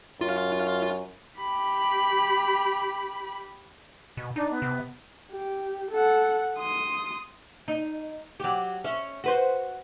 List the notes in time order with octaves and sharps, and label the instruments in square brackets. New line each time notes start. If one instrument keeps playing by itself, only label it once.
[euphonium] F#2 [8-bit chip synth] F4
[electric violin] G4 B5
[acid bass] B2
[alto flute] D4 [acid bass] D#4
[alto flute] B3
[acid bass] C3
[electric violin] G4
A4 F#5
C6 D#6
[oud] D#4
F#3 G4
C#4 E5
F#4 B4 C5